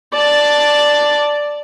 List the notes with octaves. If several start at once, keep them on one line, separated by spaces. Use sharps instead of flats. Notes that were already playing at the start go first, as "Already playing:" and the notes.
D5 A5